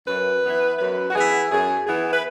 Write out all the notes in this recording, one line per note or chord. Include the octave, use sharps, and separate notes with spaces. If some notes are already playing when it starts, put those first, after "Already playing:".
F#2 B4
E3 B3 E4
F#2 B4
F#4
E3 B3 E4 G#4
F#2 G#4
E3 B3 E4 G#4
B4